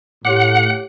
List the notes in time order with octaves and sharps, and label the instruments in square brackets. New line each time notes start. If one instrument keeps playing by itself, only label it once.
[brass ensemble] A2 [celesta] G4 C#5 D6 [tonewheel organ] F#5